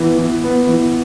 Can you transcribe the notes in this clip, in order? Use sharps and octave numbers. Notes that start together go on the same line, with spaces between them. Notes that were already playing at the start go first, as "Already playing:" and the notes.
Already playing: E3 B3
E3
B3
E3